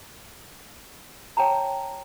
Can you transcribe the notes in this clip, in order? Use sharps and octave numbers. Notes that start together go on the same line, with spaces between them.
C#5 G5 A5 A#5